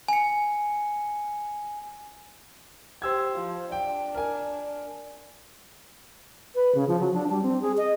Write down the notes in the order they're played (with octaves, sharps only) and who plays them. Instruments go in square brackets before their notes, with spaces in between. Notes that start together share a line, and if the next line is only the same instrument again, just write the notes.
[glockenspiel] G#5 C#7
[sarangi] G4 [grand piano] C5 E6 G#6
[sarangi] F3
[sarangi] D4 [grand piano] G5
[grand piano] A#4 G#5
[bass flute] B4
C#3
F3
F#3
D4
G3
C4
G#4
D#5